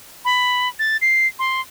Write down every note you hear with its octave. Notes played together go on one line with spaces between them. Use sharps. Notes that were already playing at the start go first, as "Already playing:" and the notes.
B5
A6
C7
C6